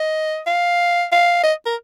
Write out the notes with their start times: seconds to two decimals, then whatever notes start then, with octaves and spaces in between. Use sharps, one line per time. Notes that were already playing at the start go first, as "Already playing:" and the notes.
Already playing: D#5
0.47 F5
1.12 F5
1.44 D#5
1.66 A#4